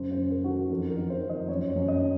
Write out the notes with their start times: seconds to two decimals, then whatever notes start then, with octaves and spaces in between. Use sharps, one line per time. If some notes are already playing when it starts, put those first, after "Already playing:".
Already playing: F#2 C#3 C5
0.11 C5
0.18 F#2
0.31 A#4
0.44 D#3 F#4
0.50 A4
0.70 F2 A#4
0.90 A#4
0.97 D#3
1.10 C5
1.23 F2
1.29 D#5
1.48 F#2 C#5
1.69 C#5
1.76 F#2
1.88 D#5
2.02 D#3